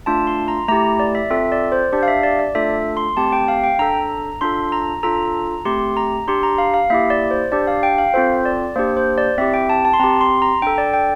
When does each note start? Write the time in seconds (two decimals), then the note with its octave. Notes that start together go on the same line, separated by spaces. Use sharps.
0.06 A3 D4 F4 A5
0.27 C6
0.48 A#5
0.68 A3 E4 G4 A#5
1.00 D5
1.15 E5
1.31 C4 F4 A4 E5
1.52 D5
1.72 C5
1.93 D4 G4 D5
2.03 F5
2.08 E5
2.23 D5
2.39 D5
2.55 A3 D4 F4 A4 E5
2.97 C6
3.17 A3 C4 G4 A5
3.32 G5
3.48 F5
3.64 G5
3.79 D4 A4 A#5
4.41 D4 F4 A4 C6
4.72 A#5
5.03 D4 F4 A4 A#5
5.65 A3 C4 G4 C6
5.97 A#5
6.27 D4 G4 C6
6.43 A#5
6.58 F5
6.74 F5
6.90 A#3 E4 G4 E5
7.10 D5
7.31 C5
7.52 D4 G4 D5
7.67 F5
7.83 G5
7.98 F5
8.14 C4 F4 A4 C5
8.46 D5
8.76 A#3 D4 G4 C5
8.97 C5
9.18 D5
9.38 C4 E4 G4 E5
9.54 G5
9.70 A5
9.85 A5
9.93 C6
10.00 C4 G4 A#5
10.21 C6
10.42 A#5
10.62 D4 A4 G5
10.78 D5
10.94 G5